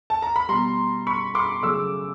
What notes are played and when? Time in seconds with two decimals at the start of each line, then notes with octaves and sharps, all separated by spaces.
0.10 A5
0.22 A#5
0.36 B5
0.49 B2 G3 A#5 C6
1.07 B5 C#6
1.35 C6 D6
1.63 C#3 F#3 A3 D6 E6